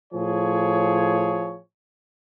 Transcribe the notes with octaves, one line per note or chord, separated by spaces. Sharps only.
A2 F3 G#4 C#5